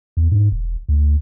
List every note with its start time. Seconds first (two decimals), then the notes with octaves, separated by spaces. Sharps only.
0.17 E2
0.31 G#2
0.52 E1
0.89 D2